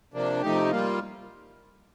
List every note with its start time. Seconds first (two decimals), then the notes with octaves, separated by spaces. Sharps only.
0.14 C3 F3 A#3 D4
0.42 C3 F3 A3 D#4 G4
0.71 G3 A#3 F4